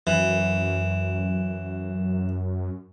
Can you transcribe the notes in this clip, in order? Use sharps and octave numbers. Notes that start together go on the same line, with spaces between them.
F#2 E3